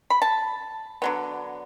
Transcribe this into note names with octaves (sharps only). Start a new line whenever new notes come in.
B5
A5
D3 F#3 B3